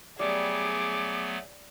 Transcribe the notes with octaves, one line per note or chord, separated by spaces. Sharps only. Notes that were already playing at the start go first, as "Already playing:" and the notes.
F#3 G3 A3 B3 G#4 D6